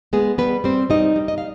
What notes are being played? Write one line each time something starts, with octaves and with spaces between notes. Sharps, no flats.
G#3 B3 G#4
G3 B3 B4
G3 C4 C5
G3 D#4 D#5
G3
D#5
F5